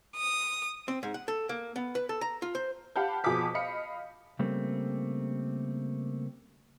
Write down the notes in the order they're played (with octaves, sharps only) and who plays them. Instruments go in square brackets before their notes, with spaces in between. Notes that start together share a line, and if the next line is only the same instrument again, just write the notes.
[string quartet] D#6
[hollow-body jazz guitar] C4
G#2
F#5
A4
A#3
B3
B4
A4
A#5
F4
C5
[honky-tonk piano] G4 F5 F#5 A5 B5 G6
F2 B2 G#4 A5 D6 B6
D#5 F5 B5 C#7
[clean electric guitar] C#3 G3 A3 A#3 C4